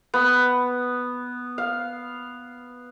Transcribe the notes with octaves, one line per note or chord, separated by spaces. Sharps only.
B3
F5